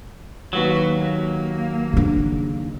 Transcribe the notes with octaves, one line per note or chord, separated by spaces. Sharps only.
D#2 G#2 F#3 F#4 B4
A#3
C#3 D4